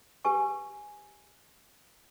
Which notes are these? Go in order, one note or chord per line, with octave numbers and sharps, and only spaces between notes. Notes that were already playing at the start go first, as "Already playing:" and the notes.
G4 B4 G#5 C#6